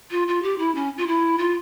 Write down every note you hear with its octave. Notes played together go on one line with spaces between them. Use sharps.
F4
F4
G4
E4
C#4
F4
E4
F4